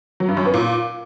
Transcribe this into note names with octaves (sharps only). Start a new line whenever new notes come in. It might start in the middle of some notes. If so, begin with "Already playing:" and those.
F#3
G2
F#2
B3
A#2